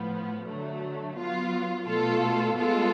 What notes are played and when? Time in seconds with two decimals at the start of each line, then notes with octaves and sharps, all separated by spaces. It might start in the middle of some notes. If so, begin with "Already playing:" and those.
Already playing: A2 F3 B3
0.47 D3 F#3 A3
1.17 F#3 B3 F4
1.87 B2 A3 F4 A4
2.56 G#3 B3 F4 A4